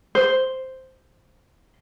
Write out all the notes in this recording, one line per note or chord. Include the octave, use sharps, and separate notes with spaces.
C5